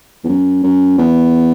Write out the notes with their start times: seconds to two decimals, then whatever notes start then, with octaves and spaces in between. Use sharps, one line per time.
0.24 E2
0.28 F#2
0.63 F#2
0.98 E2